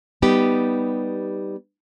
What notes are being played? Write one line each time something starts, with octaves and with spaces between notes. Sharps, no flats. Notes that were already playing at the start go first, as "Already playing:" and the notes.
G3 B3 D#4 G4